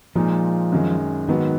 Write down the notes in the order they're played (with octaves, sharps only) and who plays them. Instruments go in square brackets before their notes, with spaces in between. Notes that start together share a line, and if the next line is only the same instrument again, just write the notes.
[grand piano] A#2 G#3 D#4 [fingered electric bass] F3
[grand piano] F#2 D#3 G#3
[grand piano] G#2 F#3 B3 [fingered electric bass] D#3